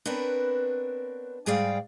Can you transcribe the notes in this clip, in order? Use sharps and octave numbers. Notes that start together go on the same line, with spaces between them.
B3 C4 D4 A#4 B4 C#5
G#2 G3 G#4 D5 F5 G5